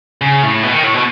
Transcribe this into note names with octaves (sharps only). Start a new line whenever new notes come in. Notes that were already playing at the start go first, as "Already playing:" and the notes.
C#3
A2
B2
D#3
A2
B2